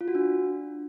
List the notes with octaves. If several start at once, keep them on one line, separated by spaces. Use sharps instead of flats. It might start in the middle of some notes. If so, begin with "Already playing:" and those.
F4
F#4
D4